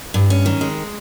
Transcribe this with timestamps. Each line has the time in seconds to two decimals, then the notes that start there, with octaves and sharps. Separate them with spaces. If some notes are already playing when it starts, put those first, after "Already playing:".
0.14 G2
0.30 C#4
0.46 D#3
0.61 G#3